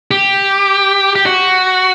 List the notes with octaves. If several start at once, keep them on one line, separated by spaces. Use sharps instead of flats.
G4
G4
F#4